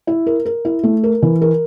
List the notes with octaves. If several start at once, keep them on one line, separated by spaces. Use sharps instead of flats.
E4
A#4
A#4
E4
A3
A#4
E3
A#4